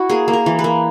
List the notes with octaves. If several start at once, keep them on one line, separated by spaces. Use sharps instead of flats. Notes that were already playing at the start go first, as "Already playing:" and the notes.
Already playing: E4 F#4
A#3 G#4
A#3
A#4
E3
B4
A#3